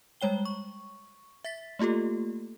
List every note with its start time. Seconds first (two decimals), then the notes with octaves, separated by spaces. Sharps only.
0.21 G3 G#3 C#5 G5 G7
0.45 C#6
1.44 E5 A6 B6
1.79 A3 A#3 F4 G4 A4